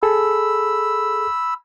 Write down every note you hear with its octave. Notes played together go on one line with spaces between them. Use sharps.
G#4 A4 B5 E6